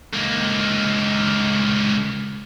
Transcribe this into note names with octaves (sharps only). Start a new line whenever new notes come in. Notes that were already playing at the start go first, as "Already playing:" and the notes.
C#2 A#3